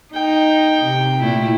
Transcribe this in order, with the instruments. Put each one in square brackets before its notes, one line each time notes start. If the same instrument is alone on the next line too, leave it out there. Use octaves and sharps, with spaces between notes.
[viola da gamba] D#4 [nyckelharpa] G5
[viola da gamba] C3
A#2 A3 E4